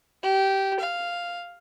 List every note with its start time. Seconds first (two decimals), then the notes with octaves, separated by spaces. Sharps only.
0.23 G4
0.80 F5